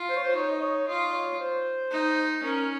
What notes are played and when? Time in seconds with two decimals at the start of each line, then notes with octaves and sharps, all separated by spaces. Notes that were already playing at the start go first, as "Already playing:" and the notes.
Already playing: F4
0.10 C5
0.16 C#5
0.23 C5
0.35 D#4 C#5
0.51 D#5
0.61 C#5
0.87 F4 D#5
1.13 C#5
1.40 C5
1.91 D#4
2.43 C#4 A#4